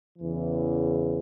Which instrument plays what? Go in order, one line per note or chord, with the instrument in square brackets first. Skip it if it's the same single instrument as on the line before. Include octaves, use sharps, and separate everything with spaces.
[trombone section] E2 C#3 E3